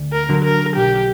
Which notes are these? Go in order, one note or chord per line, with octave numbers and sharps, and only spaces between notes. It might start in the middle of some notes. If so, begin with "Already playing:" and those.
Already playing: D2
A#4
D3 F#3
A#4
B1 G4